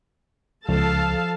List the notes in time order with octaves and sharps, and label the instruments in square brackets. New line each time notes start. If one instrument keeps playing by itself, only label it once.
[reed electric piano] C#2 [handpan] F3 [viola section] A4 F5 A5